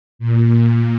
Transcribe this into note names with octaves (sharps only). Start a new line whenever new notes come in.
A#2
A#2